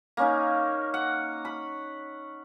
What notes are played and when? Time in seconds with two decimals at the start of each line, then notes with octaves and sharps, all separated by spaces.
0.17 A#3 C#4 D#4
0.94 F#5
1.45 B5